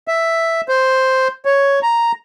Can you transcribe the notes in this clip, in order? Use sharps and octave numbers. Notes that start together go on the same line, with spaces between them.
E5
C5
C#5
A#5